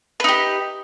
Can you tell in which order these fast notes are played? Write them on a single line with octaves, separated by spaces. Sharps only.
B4 D#4 G4